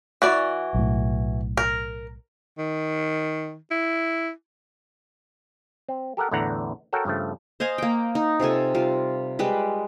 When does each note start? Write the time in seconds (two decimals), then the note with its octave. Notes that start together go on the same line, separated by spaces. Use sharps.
0.22 E3 F#4 D5
0.74 B1 A2
1.57 A#4
2.58 D#3
3.71 E4
5.89 C4
6.17 G4 A4 A#4 F#5
6.31 E2 A2 D3 E3 F#5 A#5
6.93 F#4 A4 A#4 C#5 F#5 G5
7.05 G2 C#3 F3 A3
7.60 C5 D#5 F5 G#5
7.78 A#3 G5
8.15 D#4
8.40 C3 F4 A4 G#5
8.75 G3 F4
9.39 G3 G#3 B4